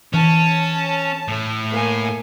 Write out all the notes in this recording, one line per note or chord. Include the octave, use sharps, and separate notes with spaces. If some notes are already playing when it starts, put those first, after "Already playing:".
E3 C#4 A5
A2 A3
A#3 G#5